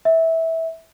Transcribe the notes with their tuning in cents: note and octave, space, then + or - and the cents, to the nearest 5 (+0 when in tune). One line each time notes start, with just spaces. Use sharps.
E5 -15